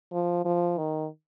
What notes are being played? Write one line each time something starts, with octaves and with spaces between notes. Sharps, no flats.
F3
F3
D#3